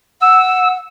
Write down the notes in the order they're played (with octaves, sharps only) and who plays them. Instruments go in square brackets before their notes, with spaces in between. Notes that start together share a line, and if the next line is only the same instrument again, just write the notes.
[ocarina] F#5 [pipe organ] E6